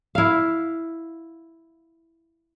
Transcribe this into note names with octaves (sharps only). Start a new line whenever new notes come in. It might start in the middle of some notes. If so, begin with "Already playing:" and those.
E4 F5